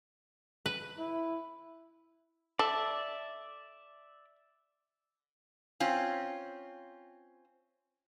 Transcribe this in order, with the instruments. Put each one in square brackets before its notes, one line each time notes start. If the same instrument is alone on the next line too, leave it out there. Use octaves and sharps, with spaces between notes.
[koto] B4
[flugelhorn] E4
[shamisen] A4 [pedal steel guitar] D5 E5
[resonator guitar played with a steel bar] C4 C#4 F4